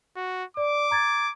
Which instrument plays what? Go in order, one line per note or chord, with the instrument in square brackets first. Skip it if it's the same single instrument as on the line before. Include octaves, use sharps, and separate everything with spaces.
[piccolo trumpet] F#4
[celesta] D5 [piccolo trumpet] D6
[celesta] A#5 G#6 A6